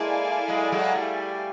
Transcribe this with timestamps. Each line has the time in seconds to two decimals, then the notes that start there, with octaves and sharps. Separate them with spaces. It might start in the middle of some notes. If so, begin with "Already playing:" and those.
Already playing: G#3 A#3 E4 A4 D5 F5 G#5
0.48 F#3 G#3
0.72 F#3 G#3
0.95 G3 A3